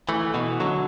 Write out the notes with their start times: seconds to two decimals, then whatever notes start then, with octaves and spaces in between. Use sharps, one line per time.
0.09 E3 A3
0.34 B2 E3
0.60 D3 F#3